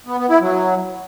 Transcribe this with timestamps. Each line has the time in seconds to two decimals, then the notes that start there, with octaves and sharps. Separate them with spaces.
0.07 B3
0.18 B3
0.29 E4
0.41 F#3